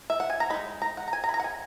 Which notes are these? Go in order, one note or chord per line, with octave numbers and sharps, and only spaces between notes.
E5
F#5
G#5
A#5
G#3 D#4 B5
A#5
F#5
A#5
G#5
A#5
B5
A#5
F#5
G#5